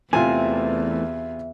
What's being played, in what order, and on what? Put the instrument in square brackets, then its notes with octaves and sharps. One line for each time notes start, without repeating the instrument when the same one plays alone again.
[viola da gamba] E2 [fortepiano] C3 F4 G#5 [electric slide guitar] E3 A3 C4 [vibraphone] E5